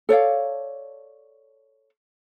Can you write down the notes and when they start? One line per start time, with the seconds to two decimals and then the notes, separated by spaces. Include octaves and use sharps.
0.09 A4 C#5 D5 F5